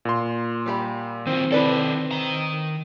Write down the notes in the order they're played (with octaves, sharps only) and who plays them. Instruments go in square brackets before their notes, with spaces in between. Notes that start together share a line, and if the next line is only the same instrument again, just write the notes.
[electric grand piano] A#2 C6
[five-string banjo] G3 G4 B5
[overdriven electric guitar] D#3 F3 [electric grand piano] C4
[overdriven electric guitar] D#3 A4 [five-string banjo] E4 B4 D5
[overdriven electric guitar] D#3 A#5